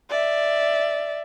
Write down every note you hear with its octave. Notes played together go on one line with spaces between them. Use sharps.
D5 E5